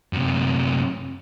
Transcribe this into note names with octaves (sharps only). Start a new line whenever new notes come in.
F#2 C3